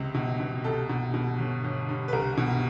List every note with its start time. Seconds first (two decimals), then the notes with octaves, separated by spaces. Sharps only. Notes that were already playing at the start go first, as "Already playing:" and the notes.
Already playing: C#2 C3
0.14 B2
0.40 B2
0.64 C2 A4
0.89 B2
1.14 B2
1.38 G1
1.64 G1
1.89 G2
2.08 B4
2.13 C2 A#4
2.37 B2